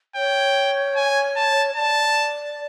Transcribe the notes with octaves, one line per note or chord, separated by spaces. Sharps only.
C#5 G5
G#5
A5
D5 A5